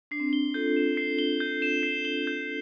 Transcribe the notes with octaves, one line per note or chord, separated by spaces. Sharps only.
D4 C7
C4
D4 G7
F4 A4 G6
E7
C7
G7
G6
E7
C7
G7
G6